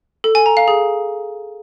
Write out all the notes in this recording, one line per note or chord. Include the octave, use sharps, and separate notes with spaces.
A4
G#5
A#5
F5
G#4